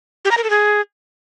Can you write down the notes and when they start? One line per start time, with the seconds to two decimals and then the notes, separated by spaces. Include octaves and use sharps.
0.25 G4
0.31 A#5
0.37 A#4
0.44 A4
0.50 G#4